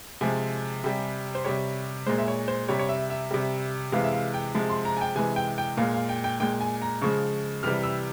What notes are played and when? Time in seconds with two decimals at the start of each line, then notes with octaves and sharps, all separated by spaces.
0.21 C3 F3 G#3 G#5
0.84 C3 G3
1.35 C5
1.45 C3 G3 C#5
2.06 A#2 G#3 C5
2.18 E5
2.28 C#5
2.48 C5
2.69 C3 G3 C#5
2.79 C#5
2.89 E5
3.10 E5
3.31 C3 G3
3.92 C3 E3 G#3 F5
4.04 E5
4.13 F5
4.34 G5
4.55 C3 F3 G#3
4.70 C6
4.85 A#5
4.97 G#5
5.01 G5
5.16 C3 E3 G#3 G#5
5.36 G5
5.58 G5
5.77 A#2 G#3 F5
5.94 F5
6.09 G5
6.24 G5
6.40 A#2 G#3 G5
6.61 G#5
6.82 A#5
7.02 C#3 F3 G#3 C#6
7.63 C3 E3 G3 F6
7.83 E6